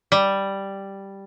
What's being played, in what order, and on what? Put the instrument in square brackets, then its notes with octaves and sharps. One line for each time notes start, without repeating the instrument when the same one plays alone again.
[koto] G3